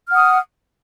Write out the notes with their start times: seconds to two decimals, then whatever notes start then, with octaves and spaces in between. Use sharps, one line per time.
0.08 F6
0.11 F#5
0.15 D#6